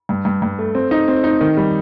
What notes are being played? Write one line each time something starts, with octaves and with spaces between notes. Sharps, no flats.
G2
G2
G2
A3
C4
D#4
C4
D#4
D#3
G3